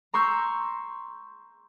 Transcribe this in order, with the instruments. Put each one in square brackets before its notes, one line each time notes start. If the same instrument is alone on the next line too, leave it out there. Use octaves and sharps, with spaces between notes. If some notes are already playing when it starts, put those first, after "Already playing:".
[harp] A#5 C6 C#6 E6 G6